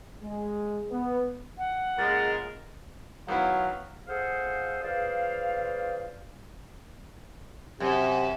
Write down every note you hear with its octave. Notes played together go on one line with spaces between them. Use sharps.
G#3
B3
F#5
A#2 C#3 G#3 A#4 A6
D#3 F#3 B3 E4 F5
F4 G#4 A4 C5 F5 F#5
F4 G#4 B4 C5 D5 F5
F#2 C3